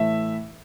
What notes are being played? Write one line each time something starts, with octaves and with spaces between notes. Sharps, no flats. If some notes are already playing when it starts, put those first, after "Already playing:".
Already playing: A2 E3 A3 E5